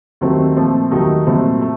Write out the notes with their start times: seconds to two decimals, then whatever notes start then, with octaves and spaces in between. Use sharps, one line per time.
0.21 D#2 D#3 F#3 A3 C4
0.56 A#2 F3 A3 C4
0.91 D#2 D#3 F#3 A3 D#4
1.26 C2 A#2 F#3 A3 C4
1.61 A3